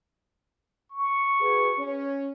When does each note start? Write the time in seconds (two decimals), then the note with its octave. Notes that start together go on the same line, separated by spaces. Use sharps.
0.91 C#6
1.41 F#4 G#4 B4
1.79 C#4